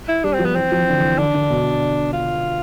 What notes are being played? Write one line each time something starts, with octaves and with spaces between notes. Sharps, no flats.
E4
G3 D4
C4
F3
B3
E3 C4
F3
E3
D3
E3
D3 D4
D3
B2
F4